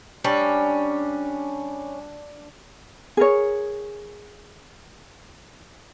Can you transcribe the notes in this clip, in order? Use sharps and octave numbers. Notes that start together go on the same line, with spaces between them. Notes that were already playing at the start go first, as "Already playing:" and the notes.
G3 C#4 D4
G#4 A#4 C#5